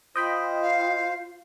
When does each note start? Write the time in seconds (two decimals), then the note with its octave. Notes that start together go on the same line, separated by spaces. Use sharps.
0.16 F4 C5 D#5 G5 B5
0.63 F5